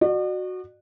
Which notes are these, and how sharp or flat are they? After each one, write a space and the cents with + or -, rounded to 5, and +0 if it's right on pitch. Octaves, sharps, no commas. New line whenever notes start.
F#4 -5 D5 +45